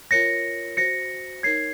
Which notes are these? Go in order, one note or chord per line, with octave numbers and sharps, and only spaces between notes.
F4 A#4 C#5 A#6 C#7
F#4 C5 A#6 C#7
D#4 A#4 C#5 G#6 C7